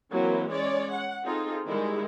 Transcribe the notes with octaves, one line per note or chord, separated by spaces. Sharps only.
E3 F#3 A#3 C4 E4
G#3 C#4 C#5 D5
F#5
C4 D#4 F4 G#4 A4
D#3 G3 G#3 E4